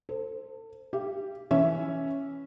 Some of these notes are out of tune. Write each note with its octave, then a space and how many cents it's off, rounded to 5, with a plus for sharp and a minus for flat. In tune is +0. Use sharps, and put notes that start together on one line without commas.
A4 +30 C5 +0
G4 +0 F5 -40
E3 +0 C#4 +0 E5 +0